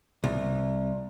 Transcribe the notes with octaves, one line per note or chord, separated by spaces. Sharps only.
C2